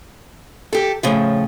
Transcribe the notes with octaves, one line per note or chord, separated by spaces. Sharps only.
G4 A4
A2 C#3 F3